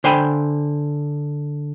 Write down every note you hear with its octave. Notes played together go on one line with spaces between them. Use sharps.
D3 C5 G5 G#5 B5